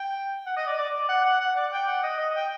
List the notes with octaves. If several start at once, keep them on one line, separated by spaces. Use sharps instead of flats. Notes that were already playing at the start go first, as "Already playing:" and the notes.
Already playing: G5
F#5
D#5
D5
D5
D5
F#5
F#5
F#5
D5
G5
F#5
D#5
D#5
G5